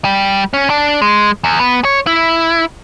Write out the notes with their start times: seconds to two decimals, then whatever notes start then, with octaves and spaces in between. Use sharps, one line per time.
0.05 G3
0.54 C#4
0.70 D4
1.02 G#3
1.44 E2
1.59 B3
1.85 C#5
2.07 E4